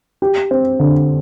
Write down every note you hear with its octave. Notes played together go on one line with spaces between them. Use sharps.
G4
C4
D3